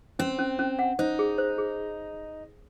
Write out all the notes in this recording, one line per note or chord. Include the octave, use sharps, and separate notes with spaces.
C4 C#4
C#4
C#4
F#5
D#4 C5
G#4
C5
G#4